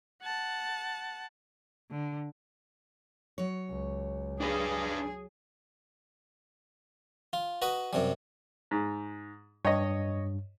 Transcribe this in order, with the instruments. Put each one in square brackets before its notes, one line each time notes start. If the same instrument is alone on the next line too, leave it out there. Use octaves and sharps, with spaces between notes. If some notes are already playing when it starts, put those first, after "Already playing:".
[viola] F#5 A5
[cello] D3
[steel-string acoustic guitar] F#3 C#5
[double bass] C#2
[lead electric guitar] D4 B4 [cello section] G#4
[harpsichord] F4
F#4 B4 D#5
F#2 C3 G3
[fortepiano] G#2
[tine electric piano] G2 [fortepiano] C#5 D#5